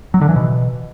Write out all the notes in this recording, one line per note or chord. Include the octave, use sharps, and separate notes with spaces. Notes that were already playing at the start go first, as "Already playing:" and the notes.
F#3
D3
E3
B2